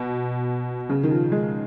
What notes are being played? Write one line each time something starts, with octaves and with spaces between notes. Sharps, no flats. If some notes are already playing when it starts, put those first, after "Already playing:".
Already playing: B2
C#3
D#3
F3
G#3